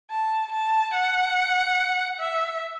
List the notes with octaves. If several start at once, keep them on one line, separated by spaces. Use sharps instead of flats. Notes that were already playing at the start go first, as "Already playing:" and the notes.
A5
A5
F#5
E5